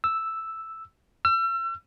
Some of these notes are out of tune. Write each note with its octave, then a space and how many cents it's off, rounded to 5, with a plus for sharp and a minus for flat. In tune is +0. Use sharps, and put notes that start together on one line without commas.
E6 +0
E6 +40